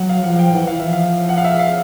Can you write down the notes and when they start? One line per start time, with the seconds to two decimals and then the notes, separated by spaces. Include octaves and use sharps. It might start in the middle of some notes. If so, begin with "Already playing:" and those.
Already playing: F#3 F#5
0.09 F5
0.24 F3 F#5
0.39 G5
0.54 E3 F#5
0.67 F5
0.79 F3 E5
0.93 F5
1.29 F#5
1.38 F5
1.44 E5
1.59 F5